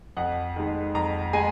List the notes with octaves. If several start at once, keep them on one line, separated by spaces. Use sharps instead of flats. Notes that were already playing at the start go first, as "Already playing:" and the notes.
F2 F#5
D#3 G#3
F2 A#5
G#3 G#5